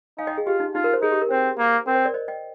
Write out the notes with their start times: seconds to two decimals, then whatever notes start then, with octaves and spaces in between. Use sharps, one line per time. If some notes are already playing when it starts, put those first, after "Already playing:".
0.18 D#4 F5 G#5
0.27 D#5 G5
0.38 G#4
0.46 F4 G4
0.60 D#4
0.74 D#4 F4
0.84 A#4
0.93 C5
1.02 D#4 G#4
1.12 G4
1.22 A#4
1.31 C4 C5
1.58 A#3
1.87 C4 A#4
1.95 C5
2.05 A#4 D5
2.14 C5 D#5
2.28 D#5 G5